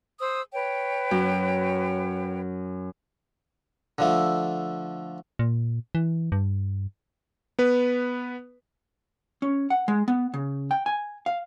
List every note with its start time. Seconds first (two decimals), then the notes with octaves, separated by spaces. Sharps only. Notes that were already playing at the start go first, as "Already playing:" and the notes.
0.20 C5 D#6 E6
0.52 B4 C#5 G5
1.11 F#2
3.98 D3 F3 A3
5.39 A#2
5.95 E3
6.32 G2
7.59 B3 B4
9.42 C#4
9.70 F#5
9.88 G#3
10.08 B3
10.34 C#3
10.71 G5
10.86 G#5
11.26 F5